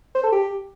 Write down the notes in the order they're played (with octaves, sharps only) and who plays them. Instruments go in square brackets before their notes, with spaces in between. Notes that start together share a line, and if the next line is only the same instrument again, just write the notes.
[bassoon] C5
A4
G4